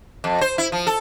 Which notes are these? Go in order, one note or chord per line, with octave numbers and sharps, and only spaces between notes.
F2
C5
E4
F3
A4